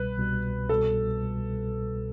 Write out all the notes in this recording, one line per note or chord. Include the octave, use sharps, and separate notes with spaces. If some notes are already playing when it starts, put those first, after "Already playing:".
Already playing: C2 B2 G3 B4
C2 B2 G3
C2 B2 G3 A4